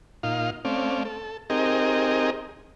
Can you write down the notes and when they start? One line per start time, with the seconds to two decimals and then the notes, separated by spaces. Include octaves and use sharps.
0.23 A#2 D#4 F4 F5
0.65 A3 C4 C#4 D5 F5
1.05 A4
1.50 C4 D#4 G4 G#4 A#4 D#5